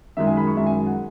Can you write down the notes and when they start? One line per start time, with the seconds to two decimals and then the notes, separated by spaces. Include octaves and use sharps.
0.17 F#2 D#3 G#3 E5
0.27 G#5
0.37 B5
0.47 C#6
0.56 F#2 D#3 G#3 E5
0.66 G#5
0.86 F#5